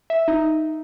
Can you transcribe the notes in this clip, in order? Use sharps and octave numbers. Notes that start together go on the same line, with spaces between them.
E5
D#4